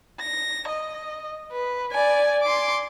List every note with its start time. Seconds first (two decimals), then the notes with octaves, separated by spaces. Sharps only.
0.20 A#6
0.68 D#5
1.52 B4
1.92 D5 G#5
2.42 C6 D6